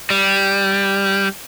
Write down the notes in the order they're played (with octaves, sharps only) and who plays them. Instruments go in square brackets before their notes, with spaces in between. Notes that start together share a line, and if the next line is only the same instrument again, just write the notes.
[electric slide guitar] G3